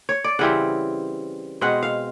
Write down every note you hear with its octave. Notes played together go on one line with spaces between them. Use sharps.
C#5
D5
C#3 E3 G3 C4 F#5
B2 G#3 C4 F#5
F5